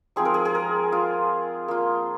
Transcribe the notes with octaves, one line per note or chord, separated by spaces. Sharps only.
F3 G#3 C4 D#4 G#4
A#4
G#4
G#4
A#4
F4
A#3 F4